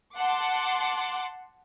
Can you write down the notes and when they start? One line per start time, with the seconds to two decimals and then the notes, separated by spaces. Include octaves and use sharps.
0.16 F#5 A5 C6 D6